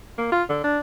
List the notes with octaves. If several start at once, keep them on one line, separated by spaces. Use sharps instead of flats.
A#3
F4
D3
D4